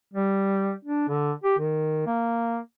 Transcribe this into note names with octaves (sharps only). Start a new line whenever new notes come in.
G3
D4
D3
G4
D#3
A#3